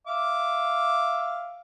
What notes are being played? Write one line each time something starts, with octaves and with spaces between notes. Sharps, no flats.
E5 F5 D6